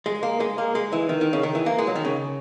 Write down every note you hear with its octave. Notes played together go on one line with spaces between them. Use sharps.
G#3
A#3
G#3
A#3
G#3
E3
D#3
D#3
C#3
D#3
E3
A#3
G#3
F#3
D#3
C#3